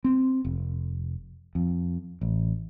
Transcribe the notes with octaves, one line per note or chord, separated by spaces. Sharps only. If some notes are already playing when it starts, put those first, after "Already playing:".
C4
F1
F2
A1